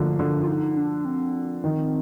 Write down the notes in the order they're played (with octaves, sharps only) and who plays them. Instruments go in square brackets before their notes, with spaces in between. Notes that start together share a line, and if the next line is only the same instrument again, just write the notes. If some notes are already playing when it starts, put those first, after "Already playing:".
Already playing: [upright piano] D3 F3 A3 A#3 [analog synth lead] D4
[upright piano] D3
[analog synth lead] F4
D#4
D4
C4
[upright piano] D#3